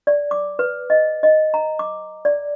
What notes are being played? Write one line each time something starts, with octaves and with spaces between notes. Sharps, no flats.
D5
D6
B4
D#5
D#5
A#5
D6
D5